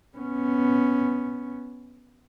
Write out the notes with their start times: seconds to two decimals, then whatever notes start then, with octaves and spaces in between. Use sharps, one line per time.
0.17 B3 C#4